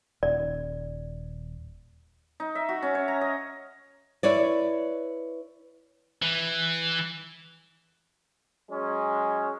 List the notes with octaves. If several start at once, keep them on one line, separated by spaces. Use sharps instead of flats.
D#1 D5
D#4
E5
F#4
C#4
C#5
A#5
D#5
E4 B4 C#5 D5
E3
F#3 G#3 C#4